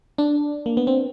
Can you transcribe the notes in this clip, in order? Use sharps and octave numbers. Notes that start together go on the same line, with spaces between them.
D4
A#3
B3
C4